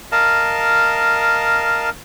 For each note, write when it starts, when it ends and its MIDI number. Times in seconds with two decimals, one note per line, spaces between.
0.12 1.90 70
0.12 1.90 75
0.12 1.90 77
0.12 1.90 81